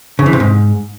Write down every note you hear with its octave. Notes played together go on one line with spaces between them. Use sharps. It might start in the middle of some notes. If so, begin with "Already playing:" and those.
C#3
E3
C3
G#2